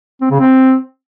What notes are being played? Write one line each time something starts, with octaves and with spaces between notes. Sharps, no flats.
C4
C#3
C4